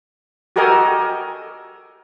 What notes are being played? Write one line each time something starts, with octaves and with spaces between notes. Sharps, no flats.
F#4 G4 A4 A#4 D#5 G#5